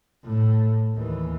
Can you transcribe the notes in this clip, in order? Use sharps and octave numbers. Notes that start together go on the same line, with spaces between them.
A2
D#2 E3